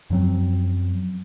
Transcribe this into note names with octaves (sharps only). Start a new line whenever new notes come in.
F#2 F3 F#3 C4